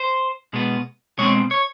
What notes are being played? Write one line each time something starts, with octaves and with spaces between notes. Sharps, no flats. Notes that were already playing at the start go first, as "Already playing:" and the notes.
Already playing: C5
B2 G#3 B3
B2 G#3 C4 C#5
C#5